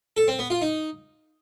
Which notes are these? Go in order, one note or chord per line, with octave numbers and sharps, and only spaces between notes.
A4
C4
B3
F4
D#4